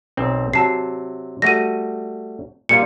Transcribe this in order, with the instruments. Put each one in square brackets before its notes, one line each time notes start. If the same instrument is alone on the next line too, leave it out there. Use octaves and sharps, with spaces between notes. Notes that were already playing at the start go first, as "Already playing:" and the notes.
[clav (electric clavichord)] B1 C4
[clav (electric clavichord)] C3 F#3 [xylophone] A5 C7
[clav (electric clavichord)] G3 A3 F#4 [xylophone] A#6 D#7
[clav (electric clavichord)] A#2 G3 F4 [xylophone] C#7